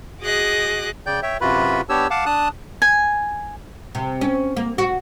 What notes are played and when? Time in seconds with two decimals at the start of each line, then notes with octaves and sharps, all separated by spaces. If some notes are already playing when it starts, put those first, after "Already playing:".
0.21 F#4 G#4 D#5 D6 F#6
1.06 C#3 D5 G5 G6
1.23 C#5 E5 G5
1.41 F#2 C3 F4 F#4 B4 B5
1.89 B3 D4 G4 C#5 E6
2.10 F5 F#5 A5 D6
2.26 D4 A5 D#6 F#6
2.82 G#5
3.95 C3
4.21 C#4
4.57 A#3
4.78 F#4